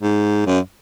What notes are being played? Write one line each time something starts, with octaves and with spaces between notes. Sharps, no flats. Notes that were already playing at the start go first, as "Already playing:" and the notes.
G#2
F#2